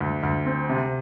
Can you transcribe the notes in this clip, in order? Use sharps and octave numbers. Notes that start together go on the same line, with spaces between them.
D2
D2
C4
C3